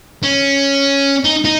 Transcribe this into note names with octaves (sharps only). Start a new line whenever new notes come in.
C#4
D#4
D#4